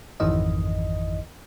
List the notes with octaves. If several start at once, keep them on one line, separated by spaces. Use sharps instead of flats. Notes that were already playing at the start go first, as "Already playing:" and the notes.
G#1 F2 D#3 E3 D#5